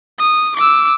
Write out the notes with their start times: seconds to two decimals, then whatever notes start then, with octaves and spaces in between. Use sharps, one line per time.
0.20 D#6
0.57 D6 E6